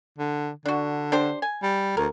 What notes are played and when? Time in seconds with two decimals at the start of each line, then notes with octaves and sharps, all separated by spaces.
0.18 D3
0.66 D3 D4 F#4
1.12 D4 G4 C5
1.42 G#5
1.63 G3
1.97 D2 A#4